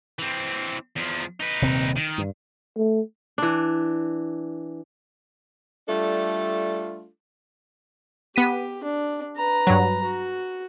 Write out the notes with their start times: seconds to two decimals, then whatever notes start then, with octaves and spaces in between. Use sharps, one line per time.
0.19 E3 C4
0.96 E2 F3
1.40 D#4 B4
1.62 D#1 C3 C4
1.96 D#3
2.18 G2
2.77 A3
3.38 E3 D4
5.89 G3 A3 D4 F4 A4
8.36 B3 G4 B6 D#7
8.84 D4
9.36 B4 A#5
9.67 G2 F#3
10.04 F#4